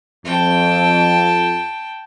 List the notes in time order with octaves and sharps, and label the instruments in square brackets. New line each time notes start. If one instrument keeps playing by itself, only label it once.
[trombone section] F2 [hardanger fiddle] G5 A5